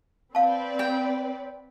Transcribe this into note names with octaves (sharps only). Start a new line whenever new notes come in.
C4 B4 D5 F5 A5
G5